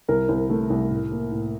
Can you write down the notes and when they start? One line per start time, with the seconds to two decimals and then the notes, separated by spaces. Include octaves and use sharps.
0.08 C2 A#4
0.29 C2
0.50 A3
0.70 C2
0.91 A2
1.12 A#3
1.32 A2